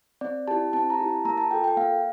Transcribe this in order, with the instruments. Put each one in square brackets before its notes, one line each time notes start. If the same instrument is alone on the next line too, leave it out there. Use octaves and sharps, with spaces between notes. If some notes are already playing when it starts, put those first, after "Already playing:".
[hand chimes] C4 D5
E4 G4 A5
C4 A5
A#5
E4 G4
A5
A#3 A#5
A5
F4 A4 G5
G5
A#3 F5